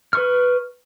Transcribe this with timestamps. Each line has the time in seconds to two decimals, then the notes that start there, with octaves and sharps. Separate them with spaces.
0.13 B4 C#6 F6